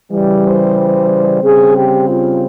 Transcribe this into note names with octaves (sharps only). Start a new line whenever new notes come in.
C#3 E3 G3
C5
C5
C#3 G3 C4 G#4
G4
F4